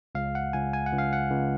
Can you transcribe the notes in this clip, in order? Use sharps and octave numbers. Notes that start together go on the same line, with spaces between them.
C#2 F5
F#5
C#2 G#5
G#5
F#5
C#2
F5
F#5
C#2